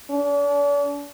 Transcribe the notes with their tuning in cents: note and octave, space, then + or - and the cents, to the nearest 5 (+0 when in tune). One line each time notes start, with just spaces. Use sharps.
D4 -40